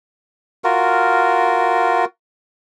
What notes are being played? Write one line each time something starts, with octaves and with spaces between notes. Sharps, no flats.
F4 F#4 A#4